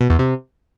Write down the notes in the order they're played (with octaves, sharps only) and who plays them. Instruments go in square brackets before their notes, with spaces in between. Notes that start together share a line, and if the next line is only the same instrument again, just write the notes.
[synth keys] B2
E2
C3